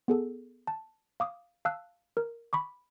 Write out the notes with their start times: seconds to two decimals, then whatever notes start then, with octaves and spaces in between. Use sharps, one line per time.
0.08 B3 G#4 A4
0.67 A5
1.20 F5 D6 D#6
1.65 F5 A5 E6 F#6
2.17 A#4
2.53 B5 C#6 D6